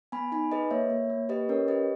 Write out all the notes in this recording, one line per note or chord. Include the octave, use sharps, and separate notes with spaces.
B3 G#5 B5
D#4 G#5 B5
G#4 B4 D#5
A#3 C#5 E5
A#3
A#3
G4 B4 D#5
C#4 A#4 C#5
G4 B4 D#5